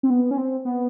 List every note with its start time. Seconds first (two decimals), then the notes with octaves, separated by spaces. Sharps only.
0.03 C4
0.10 B3
0.31 C#4
0.37 C4
0.65 B3